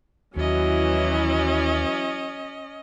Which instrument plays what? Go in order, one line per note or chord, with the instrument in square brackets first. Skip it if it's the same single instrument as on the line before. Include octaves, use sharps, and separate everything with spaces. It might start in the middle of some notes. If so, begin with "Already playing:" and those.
[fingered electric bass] D#2 [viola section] E3 F#3 E4 [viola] C#4 D#5